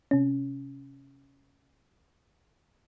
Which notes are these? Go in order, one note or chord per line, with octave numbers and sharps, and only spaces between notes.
C3 C#4